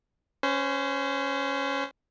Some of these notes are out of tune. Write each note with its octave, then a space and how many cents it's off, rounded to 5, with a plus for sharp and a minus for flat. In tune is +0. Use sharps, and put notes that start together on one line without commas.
C#4 +0 C5 -30